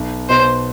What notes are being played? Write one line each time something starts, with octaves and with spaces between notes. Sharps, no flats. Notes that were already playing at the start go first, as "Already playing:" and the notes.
Already playing: B1
B2 C5